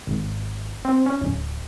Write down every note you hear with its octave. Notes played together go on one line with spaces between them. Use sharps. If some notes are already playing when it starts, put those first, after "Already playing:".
G#1
C4
C#4
D1